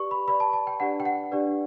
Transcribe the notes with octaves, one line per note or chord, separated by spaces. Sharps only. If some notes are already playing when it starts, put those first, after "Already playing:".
Already playing: G4 B4 D5 C#6
B5
G4 B4 D5 B5
A5
A5
G5
D4 G4 B4 D5 F#5
G5
F#5
D4 G4 B4 D5